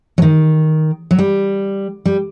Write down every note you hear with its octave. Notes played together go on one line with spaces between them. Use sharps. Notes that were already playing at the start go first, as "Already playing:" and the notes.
F#3
D#3
F#3
G3
G3